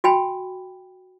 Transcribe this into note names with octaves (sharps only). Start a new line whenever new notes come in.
F#4 G5 G#5 B5